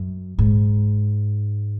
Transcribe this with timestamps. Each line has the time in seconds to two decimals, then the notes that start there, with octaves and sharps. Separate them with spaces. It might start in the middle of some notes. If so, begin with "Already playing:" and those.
Already playing: F#2
0.39 G#2